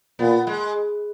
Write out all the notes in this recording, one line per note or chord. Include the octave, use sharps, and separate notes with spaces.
A#2 B3
G#3